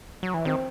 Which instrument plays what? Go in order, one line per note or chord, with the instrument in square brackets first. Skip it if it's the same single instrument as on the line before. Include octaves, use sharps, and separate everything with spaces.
[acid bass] F#3
E3
[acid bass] D#3 [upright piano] C4